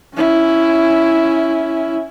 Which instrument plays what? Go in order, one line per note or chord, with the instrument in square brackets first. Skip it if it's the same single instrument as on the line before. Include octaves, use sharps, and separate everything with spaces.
[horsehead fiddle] C#4 E4